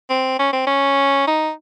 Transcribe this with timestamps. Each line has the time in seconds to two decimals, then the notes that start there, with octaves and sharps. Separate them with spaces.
0.10 C4
0.39 C#4
0.53 C4
0.67 C#4
1.28 D#4